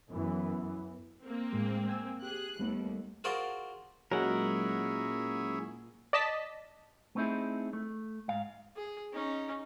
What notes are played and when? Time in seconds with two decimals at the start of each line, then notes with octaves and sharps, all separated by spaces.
0.10 F#2 E3 B3
1.23 A#3 C4
1.53 A2 G#3
1.87 G5 G#5 E6
2.22 G4 G#4 F#6
2.59 D#2 G3 A3 B3
3.24 F4 F#4 G#4 A#4 C5 D5
4.12 A#2 F#3 G#3 C#4 E4 G#4 A#4 F#5
6.13 D5 D#5 A5 B6
7.15 A3 B3 C4 D#4 E4 G#4
7.73 A3
8.28 G#2 F5
8.77 G#4
9.13 C#4 D#4